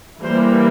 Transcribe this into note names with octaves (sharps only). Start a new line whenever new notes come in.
E3 G3 A#3 C5